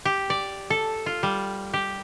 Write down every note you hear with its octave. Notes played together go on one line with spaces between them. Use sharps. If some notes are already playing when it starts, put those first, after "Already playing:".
G4
D5
A4
F4
G3
G4